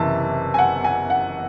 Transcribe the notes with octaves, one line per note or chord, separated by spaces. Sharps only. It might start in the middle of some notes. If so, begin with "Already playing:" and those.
Already playing: F#1 C3 E3 E5 A5
G#5
F#5
G#5
F#5